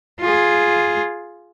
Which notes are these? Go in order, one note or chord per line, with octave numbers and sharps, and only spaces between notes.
F4 G#4